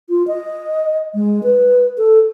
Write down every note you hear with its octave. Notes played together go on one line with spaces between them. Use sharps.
F4
D#5
G#3
B4
A4